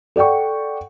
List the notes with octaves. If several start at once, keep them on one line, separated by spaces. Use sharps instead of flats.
A4 D5 F#5 G5 C#6